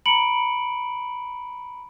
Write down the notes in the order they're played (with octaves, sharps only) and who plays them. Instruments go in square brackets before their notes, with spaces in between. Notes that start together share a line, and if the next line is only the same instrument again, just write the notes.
[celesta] A#5 B5 C#7 D7 F#7